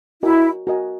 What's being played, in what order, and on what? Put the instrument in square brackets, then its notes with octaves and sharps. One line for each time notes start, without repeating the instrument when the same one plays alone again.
[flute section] E4 [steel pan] F#4 A#4 D#5 G#5
[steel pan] F#4 A#4 D#5 G#5